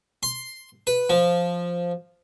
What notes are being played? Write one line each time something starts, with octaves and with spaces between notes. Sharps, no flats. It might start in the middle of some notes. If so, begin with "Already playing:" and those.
C6
B4
F3